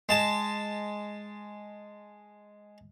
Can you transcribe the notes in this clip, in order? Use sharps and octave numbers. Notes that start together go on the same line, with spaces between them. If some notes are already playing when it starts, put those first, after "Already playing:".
G#3 A5